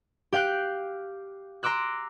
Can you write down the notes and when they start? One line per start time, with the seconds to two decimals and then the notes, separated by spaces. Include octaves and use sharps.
0.32 G4 F5 G5 F#6
1.63 A#5 C6 D6 E6 F#6